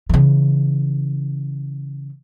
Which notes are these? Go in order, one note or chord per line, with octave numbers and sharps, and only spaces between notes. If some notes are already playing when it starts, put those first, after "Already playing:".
C#3 E3